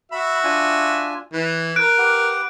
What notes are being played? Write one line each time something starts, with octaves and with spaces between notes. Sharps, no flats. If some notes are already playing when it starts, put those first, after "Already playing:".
F#4 E5 B5
D4 F4 G#5
E3 B4
A#4 F#6 D7
G4 B4 F#5